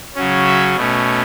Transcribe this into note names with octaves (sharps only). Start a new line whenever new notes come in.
C#3 F#3 C#4
E5
B2 A3 C#4